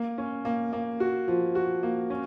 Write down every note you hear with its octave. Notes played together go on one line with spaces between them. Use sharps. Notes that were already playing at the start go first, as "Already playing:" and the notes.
Already playing: A#3
C#4
A#3
A#3
F#4
F3
F#4
A#3
C#4